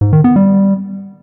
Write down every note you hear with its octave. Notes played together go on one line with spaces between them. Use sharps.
G#2
D#3
B3
G3